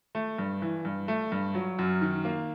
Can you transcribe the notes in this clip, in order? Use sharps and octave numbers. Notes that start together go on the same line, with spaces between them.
A3
G2
E3
G2
A3
G2
F#3
F#2
D#3
A#3